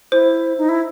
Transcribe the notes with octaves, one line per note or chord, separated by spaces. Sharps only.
E4 C5
D#4
E4